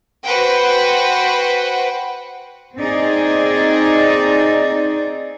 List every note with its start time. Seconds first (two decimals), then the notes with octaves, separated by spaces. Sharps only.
0.25 F#4 B4 C5 F#5 G5
2.76 C4 D#4 G#4 D5